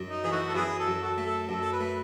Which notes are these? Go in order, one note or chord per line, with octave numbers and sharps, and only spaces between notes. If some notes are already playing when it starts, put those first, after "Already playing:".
Already playing: F#2
D#4
E3 G#4
A3 D#4 F#4
A4
F#2 B3 E4 G#4
A4
F#2
F#4 A4
A3
A4
F#2 A4
A4
B4
A3